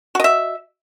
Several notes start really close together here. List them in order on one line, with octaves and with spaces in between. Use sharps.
F#4 D#5 E5